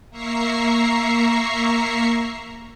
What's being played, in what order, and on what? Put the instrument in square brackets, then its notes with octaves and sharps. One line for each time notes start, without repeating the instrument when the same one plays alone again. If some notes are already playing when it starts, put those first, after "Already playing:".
[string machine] A#3 E5 A#5 C#6 C7